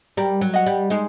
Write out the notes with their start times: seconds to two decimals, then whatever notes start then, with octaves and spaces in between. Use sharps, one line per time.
0.17 G3 A#4
0.41 F#3
0.54 D#5 F#5
0.66 G3
0.90 G#3 D#4